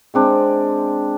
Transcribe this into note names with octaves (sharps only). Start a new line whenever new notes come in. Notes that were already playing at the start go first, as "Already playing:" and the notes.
G#3 C4 D4